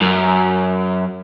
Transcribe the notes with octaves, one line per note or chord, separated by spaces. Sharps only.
F#2